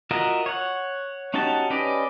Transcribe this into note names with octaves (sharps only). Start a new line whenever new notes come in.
F4 F#4 A#4 D#5 E5
C#5 F#5
C#4 D#4 F#4 G4 A5
C#4 G4 B4 D5 D#5